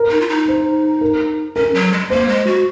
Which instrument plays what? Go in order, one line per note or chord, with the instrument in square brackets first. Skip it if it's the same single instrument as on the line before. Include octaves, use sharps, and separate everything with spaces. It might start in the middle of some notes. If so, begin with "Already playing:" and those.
Already playing: [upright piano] A#4
[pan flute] D#4
F4
D#4
[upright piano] C5
A#4
[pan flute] C#4 [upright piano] A#4
[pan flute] F#3
G#3
[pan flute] A#3 [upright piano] C5
[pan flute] G#3
F#4